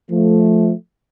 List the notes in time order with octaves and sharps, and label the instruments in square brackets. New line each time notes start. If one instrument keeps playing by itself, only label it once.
[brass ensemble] F3 A3